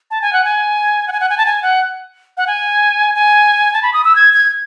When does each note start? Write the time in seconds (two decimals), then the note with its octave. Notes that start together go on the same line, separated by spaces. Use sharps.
0.11 A5
0.22 G#5
0.33 F#5
0.44 G#5
1.08 F#5
1.12 G#5
1.20 F#5
1.29 G#5
1.38 A5
1.46 G#5
1.62 F#5
2.37 F#5
2.47 G#5
3.15 G#5
3.73 A5
3.83 B5
3.93 D#6
4.05 E6
4.16 G#6
4.33 G#6